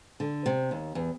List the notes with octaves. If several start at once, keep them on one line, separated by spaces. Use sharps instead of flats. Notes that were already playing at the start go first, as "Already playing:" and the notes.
D3
C3
D#2
E2